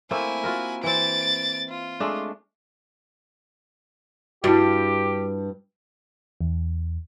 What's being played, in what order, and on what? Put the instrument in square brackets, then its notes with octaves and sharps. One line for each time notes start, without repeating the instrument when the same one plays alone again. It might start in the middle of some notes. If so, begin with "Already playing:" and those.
[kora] A3 A#3 C4 [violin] E4 G#5
[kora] F4 F#4 A#4
[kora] E3 C4 [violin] A6 D7
[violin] F4
[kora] G#3 A3 D4
[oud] G2 [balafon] E4 F#4 [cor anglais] G4
[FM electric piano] E2